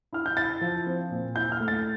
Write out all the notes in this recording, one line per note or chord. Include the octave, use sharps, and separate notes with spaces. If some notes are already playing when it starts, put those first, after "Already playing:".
E4 F6
G6
E4 A6
F3
C4
A#2
E4 G6
F6
A3
A6